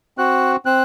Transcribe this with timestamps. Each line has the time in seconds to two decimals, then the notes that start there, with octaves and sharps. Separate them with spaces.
0.18 C4 F#4 F#6
0.66 C4 F#6